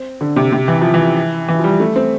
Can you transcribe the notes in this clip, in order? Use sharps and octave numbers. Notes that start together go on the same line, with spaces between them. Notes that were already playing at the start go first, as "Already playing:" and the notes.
Already playing: C4
D3
C3
C3
E3
F3
E3
E3
F3
G3
A3
C4